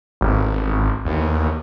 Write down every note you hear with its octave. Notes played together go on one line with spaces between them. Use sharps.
G#1
D#2